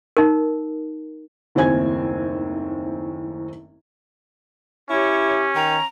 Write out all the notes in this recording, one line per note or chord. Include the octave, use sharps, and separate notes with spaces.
D#4 A#4
F#1 D#2 A2 C4 G#5 G#6
C#4 E4 G4 C#5
D#3 A#5